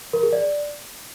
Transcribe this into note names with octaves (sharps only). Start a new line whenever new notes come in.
A#4
G#4
D5